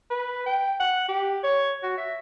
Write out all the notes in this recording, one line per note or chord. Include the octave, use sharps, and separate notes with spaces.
B4
G5
F#5
G4
C#5
F#4
E5